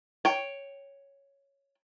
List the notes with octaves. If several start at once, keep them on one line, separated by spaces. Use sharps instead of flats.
C#5 G5